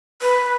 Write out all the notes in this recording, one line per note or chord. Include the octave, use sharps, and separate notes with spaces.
B4